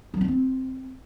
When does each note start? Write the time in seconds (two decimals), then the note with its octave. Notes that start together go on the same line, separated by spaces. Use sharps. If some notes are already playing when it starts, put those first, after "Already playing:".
0.14 F#3
0.21 C#4
0.28 C4